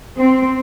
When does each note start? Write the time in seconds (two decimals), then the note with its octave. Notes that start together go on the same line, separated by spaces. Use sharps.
0.18 C4